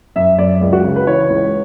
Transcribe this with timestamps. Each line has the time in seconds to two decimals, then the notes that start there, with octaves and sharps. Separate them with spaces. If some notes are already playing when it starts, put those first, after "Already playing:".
0.16 F#2 E5
0.38 F#2 D5
0.61 C#2
0.73 F#4
0.84 C#3
0.96 B4
1.07 E3 C#5
1.30 C#2